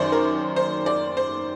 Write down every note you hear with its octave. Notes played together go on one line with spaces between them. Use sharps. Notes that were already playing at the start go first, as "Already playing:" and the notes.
Already playing: F#2 D#3 C5 D5
A#4
C5
D5
C5